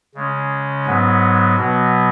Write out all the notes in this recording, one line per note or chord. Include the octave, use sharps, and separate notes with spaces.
C#3 G#3 C#4
G#2 F#3 B3
B2 F#3 B3